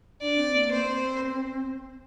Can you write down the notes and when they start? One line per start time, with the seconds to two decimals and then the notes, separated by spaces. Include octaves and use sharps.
0.21 D4 D5
0.38 C4
0.55 A#3
0.72 C4 C5